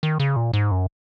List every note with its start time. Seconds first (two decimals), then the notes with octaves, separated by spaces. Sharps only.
0.03 D#3
0.20 C#3
0.36 A#2
0.53 G#2
0.71 F#2